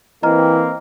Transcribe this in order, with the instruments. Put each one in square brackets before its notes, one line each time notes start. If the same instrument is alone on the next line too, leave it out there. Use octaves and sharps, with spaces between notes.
[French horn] E3 [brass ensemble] A#3 C4 [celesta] D#5 A#5 F6